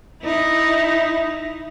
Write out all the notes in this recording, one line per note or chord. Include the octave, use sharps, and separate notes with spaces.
D#4 E4